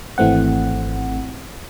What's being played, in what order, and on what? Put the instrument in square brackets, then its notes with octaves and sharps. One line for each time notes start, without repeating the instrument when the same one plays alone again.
[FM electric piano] G#1 E3 A3 C4 F#5